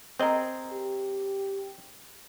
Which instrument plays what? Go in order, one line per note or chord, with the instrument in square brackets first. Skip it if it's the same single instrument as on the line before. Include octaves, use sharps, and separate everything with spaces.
[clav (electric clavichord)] C4 D#5 [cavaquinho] G#4 A#4
[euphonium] G4